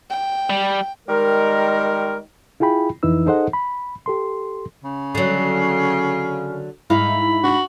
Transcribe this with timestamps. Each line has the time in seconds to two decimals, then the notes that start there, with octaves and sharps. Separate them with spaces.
0.10 G5
0.50 G3
1.08 D#3 G3 G#3 A#4
2.60 E4 F4 G#4 G5 B5
3.03 F2 E3 D#4 E4 B4 E6
3.26 D#4 G#4 A4 C5 D#5 F#5
3.53 B5
4.06 G4 A4 C6
4.84 C#3
5.15 D3 F#3 C7
6.90 G#2 D#4 E4 F5 B5
7.43 D4 F#4 F#7